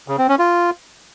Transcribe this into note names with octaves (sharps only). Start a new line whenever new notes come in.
C#3
C4
C#4
F4